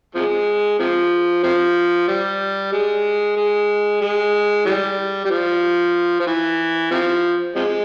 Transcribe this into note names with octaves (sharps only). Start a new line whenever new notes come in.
C3 F3 G#3
C3 F3
C3 F3
G3
G#3
G#3
G#3
E3 G3
G3
F3
F3
E3
C3 F3
C3 F3 G#3